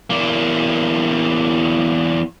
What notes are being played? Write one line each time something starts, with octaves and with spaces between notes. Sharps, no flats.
E2 A#3